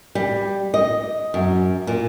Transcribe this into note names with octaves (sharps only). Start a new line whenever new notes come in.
G3
D#5
F#2
A#2